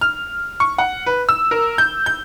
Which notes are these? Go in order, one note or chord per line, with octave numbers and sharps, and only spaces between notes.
F6
C#6
F#5
B4
E6
A#4
G6
G6